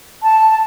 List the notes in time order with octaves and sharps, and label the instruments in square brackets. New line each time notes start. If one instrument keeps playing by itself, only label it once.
[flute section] A5